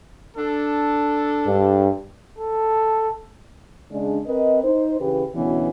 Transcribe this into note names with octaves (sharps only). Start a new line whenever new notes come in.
D4 A4
G2
A4
C#3 G#3 D4
C4 A#4 B4 D#5
D#4 C5
C#3 E3 G4 B4
D2 B2 E3 B3 C#4